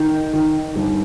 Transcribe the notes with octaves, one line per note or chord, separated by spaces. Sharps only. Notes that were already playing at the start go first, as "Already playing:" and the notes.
Already playing: D#3
D#3
G1